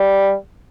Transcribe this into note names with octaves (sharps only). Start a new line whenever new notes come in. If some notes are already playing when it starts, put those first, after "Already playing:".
Already playing: G3